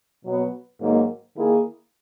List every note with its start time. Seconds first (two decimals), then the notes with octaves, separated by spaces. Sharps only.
0.23 B2 F#3 B3
0.79 G#2 D#3 F#3 A#3
1.35 D#3 A#3 E4 G#4